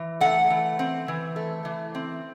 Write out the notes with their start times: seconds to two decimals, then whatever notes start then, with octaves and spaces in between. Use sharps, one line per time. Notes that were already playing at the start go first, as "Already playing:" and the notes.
Already playing: E3
0.21 A3 F#5
0.50 E3
0.79 C4
1.08 E3
1.36 A3
1.65 E3
1.95 C4